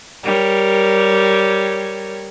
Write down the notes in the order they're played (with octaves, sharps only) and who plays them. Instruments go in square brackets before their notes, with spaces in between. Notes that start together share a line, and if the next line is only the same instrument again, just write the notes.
[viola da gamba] G3 A#4 C#5